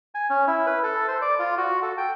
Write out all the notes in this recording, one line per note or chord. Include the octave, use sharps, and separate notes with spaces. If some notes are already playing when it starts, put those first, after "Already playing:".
G#5
C#4
E4
B4
A4
C5
D5
F4
F#4
A4
G5